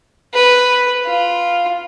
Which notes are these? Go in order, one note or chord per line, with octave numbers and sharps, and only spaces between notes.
B4
F4